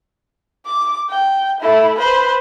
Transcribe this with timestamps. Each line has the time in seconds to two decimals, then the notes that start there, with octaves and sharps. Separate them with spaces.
0.66 D6
1.10 G5
1.61 A3 E4
1.98 B4 C5